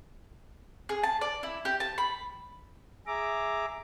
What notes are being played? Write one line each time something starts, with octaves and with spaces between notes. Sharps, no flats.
G#4
A5
D5
E4
G4
A5
B5
G#4 E5 A#5 D6